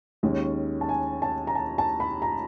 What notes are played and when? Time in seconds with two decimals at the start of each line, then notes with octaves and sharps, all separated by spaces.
0.23 D#2 D#3 G#3 C#4
0.81 A5
0.89 G#5
1.22 A5
1.47 A#5
1.55 A5
1.78 A5
2.00 B5
2.22 A#5